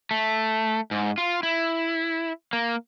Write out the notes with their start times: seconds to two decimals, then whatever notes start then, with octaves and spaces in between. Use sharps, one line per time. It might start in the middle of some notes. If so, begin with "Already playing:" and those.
0.11 A3
0.91 G#2
1.18 F4
1.43 E4
2.53 A#3